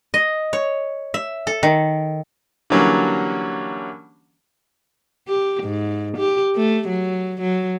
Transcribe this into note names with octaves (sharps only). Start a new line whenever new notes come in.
D#5
C#5
E5
A4
D#3
D3 E3 F#3 G3 A#3 C#4
G4
G#2
G4
A3
F#3
F#3